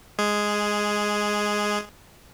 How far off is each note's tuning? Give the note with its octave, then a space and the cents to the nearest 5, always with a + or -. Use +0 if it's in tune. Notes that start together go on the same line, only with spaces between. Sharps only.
G#3 +0 G#4 +0